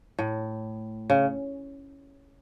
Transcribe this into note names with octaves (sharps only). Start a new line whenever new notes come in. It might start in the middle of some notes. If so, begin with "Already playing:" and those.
A2
C#3